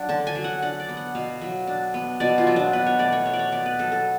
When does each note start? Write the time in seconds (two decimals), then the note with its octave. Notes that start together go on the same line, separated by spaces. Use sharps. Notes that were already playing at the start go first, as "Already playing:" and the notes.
Already playing: F#3 D4 F#5
0.09 D3 A5
0.27 G#5
0.35 F#3
0.44 F#5
0.62 D4 F#5
0.80 D5
0.89 B3
0.97 F#5
1.15 B2 F5
1.41 F#3
1.67 D4
1.94 B3
2.20 B2 D5
2.38 F4
2.47 F#3
2.56 D4
2.73 B2 B4
2.86 C#5
2.99 A3 D5
3.12 C#5
3.26 F#3 C#5
3.33 D5
3.39 C#5
3.52 B3 D5
3.66 B4
3.79 F#3 A4
3.92 A4